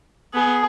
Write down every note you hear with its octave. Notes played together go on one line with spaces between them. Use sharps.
B3 G#4